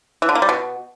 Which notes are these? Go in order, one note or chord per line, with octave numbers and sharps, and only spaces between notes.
E3
D3
A#3
G3
B2